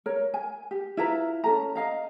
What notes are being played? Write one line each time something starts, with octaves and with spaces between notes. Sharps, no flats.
A#4 C#5
G#5
G4
E4 F4 B4 A#5
C#4 A4 A#5
D#5 F5 A#5